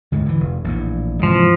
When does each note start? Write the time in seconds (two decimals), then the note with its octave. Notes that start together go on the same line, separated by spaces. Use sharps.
0.12 D2 G#2 C#3
0.26 D3 E3
0.40 F1
0.64 A#1 E2 A2
1.23 G#2 C3 E3 F3